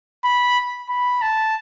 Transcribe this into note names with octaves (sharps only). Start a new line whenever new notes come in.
B5
B5
A5